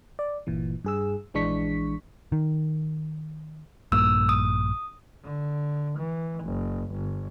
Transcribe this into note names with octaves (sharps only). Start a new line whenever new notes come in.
D5
G1 A#2 E3
G2 G#4 E6
A#1 E3 G#3 D4 C#6 B6
D#3
A#1 G2 A#3 E6
D#6
D3
E3
F#1
G1